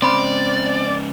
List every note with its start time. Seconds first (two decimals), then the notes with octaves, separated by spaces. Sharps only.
0.02 G#2 C#3 C4 D5 B5 C6